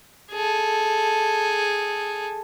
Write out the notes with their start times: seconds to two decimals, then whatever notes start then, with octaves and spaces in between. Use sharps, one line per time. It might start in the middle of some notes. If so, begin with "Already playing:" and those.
0.32 G#4 A4